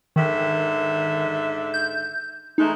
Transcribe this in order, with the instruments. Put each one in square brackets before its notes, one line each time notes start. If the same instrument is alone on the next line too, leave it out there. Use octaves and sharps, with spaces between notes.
[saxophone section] G#2 D3 E5 [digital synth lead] D#3
[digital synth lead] G6
[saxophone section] E3 G#3 A3 [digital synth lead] D#4